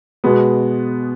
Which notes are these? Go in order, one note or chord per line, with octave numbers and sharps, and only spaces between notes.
B2 G#3 B3 F#4